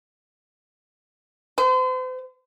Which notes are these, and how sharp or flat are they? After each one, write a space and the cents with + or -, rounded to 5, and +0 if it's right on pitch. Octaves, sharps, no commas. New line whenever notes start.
C5 -40